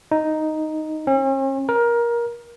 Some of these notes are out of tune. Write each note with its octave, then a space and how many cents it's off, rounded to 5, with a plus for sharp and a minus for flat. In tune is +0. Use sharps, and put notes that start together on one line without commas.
D#4 +0
C#4 -45
A#4 +20